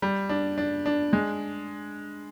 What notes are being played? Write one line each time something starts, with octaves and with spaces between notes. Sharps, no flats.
G3
D4
D4
D4
G#3